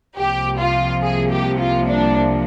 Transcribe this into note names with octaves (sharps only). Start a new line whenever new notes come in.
C2 C3 F3 A#3 G4
F4
G#4
G4
F4
D4